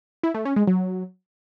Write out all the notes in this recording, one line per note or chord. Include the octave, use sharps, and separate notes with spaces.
E4
A3
C#4
G#3
F#3